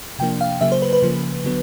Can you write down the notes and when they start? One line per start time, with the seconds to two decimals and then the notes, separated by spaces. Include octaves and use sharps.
0.19 C3 F3 A#3 D4 G5
0.41 F5
0.61 C#3 F#3 A#3 E5
0.72 C5
0.82 B4
0.93 B4
1.02 C#3 F3 A#3
1.44 D3 F#3 B3